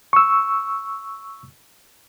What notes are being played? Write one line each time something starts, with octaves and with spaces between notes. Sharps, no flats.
C#6 E6